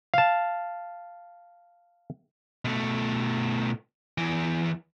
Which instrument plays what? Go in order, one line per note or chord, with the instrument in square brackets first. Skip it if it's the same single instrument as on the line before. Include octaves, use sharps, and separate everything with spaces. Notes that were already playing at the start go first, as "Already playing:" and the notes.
[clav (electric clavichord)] F5 A5
[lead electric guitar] B2 A3
E2 E3